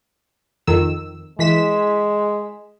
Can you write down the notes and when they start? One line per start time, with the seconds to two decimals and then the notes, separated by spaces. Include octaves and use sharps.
0.67 F2 D#3 E6
1.39 E3 G#3 B6 E7